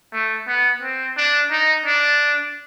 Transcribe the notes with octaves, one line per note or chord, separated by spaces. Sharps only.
A3
B3
C4
D4
D#4
D4